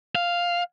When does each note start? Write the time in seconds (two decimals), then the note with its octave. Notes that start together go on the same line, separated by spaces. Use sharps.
0.15 F5